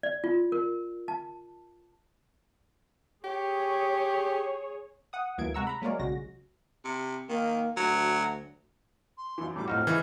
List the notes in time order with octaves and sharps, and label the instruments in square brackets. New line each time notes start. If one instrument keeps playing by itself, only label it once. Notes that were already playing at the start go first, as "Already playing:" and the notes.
[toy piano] D5
F4
A#4
A5
[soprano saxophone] G4 [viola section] G#4 C#5
[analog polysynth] F#5 D#6
D2 E3 F#3 A#3 G#6 D7
C3 G#3 F#5 A#5 C#6 E6
A#5 B5
F#3 G#3 A#3 A#4 C#5 D5
B1 C#3 G#3 F#4 A#6
[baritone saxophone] C3
[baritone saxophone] D#3 [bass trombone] A#3
[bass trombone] D2 [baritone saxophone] F#3
[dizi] C6
[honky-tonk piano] F#2 E3
[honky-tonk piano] A2 F#3 G3 [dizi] D6
[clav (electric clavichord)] A2 D#4 F#4 [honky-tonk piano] F3 C4 [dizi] F6
[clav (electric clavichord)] C#3 [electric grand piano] E3 [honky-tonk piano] D#4 B4